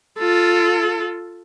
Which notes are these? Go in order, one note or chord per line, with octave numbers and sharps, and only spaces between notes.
F4 A4